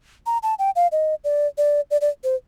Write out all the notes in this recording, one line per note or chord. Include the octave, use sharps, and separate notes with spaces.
A#5
A5
G5
F5
D#5
D5
D5
D5
D5
C5